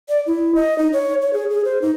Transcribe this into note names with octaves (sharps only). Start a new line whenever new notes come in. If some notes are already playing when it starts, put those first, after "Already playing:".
D5
E4
D#5
D#4
C#5
C#5
G#4
G#4
C5
D#4